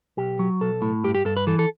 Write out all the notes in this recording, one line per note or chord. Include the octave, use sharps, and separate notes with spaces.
B1 G4
F#3
B1 A4
A2
G2 G4
G4
G2 A4
B4
E3 A4
A4